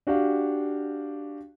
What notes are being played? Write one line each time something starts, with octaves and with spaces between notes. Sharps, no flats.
D4 F#4 G4 F5